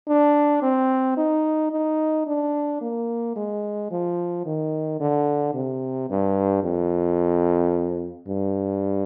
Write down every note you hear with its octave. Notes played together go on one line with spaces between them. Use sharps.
D4
C4
D#4
D#4
D4
A#3
G#3
F3
D#3
D3
C3
G2
F2
G2